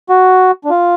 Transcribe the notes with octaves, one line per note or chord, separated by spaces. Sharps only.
F#4
D4
F4